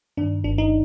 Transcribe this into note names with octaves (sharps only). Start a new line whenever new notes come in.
G2 D#3 D4
G1 D4
D#4